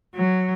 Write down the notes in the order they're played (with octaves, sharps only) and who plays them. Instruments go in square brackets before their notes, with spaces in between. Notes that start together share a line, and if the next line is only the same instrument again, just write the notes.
[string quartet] F#3